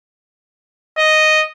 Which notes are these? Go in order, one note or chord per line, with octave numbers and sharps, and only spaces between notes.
D#5